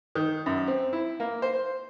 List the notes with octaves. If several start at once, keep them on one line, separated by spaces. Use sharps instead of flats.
D#3
F#2
C4
E4
A#3
C5